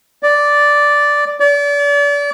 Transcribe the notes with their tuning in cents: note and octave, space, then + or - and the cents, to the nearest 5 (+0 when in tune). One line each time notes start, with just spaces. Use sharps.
D5 -5
D5 -35